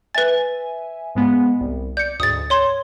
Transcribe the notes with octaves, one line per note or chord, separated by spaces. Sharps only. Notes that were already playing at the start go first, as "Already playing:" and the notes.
B4 E5 G#5 A6
G#2 G#3 B3
C2
D5 G6 C#7
D2 G#2 D#6 A6
C#5 C6 G#6